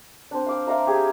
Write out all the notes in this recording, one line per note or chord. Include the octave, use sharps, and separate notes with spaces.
C4 D4
F5 D6 E6
D5 E5 F5 A#5
G4 G#4 G#5